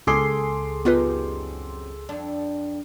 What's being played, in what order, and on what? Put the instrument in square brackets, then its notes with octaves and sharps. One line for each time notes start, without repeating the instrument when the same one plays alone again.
[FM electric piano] C#2 G#4 C6 [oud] A#3 [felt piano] A4 D6 C7
[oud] F#2 C3 D#4 [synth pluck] B3 F4 B4
[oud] F2 D4